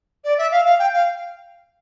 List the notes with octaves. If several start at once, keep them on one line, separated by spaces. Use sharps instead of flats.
D5
E5
F5
F5
G5
F5